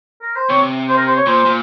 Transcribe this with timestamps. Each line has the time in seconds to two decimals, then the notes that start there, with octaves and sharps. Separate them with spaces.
0.22 A#4
0.36 C5
0.49 C3 C#5
0.89 C5
0.97 A#4
1.07 C5
1.17 C#5
1.26 A#2 C5
1.45 A#2